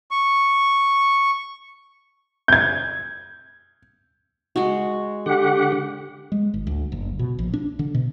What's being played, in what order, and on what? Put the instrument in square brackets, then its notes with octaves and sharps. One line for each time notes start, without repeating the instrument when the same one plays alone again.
[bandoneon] C#6
[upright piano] G6 G#6
[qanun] G#3 F#4
[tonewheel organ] D3 G4 F#5
[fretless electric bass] G#3
G#1
D2
F#1
B2
A#1
D4
D3
B2